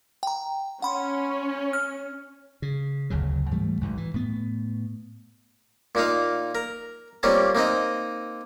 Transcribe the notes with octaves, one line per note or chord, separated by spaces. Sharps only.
G5 A#5
C#4 F#5 B5 C6
F6
C#3
F#1 D2 C#3 F#3
G#2 E3 G3 A3
B1 G#2 B2
E3
A2 B3
A#2 A#3 D#4 F5
A#4
G3 A#3 C4 C#4 F4
A#3 C4 D#4 D#5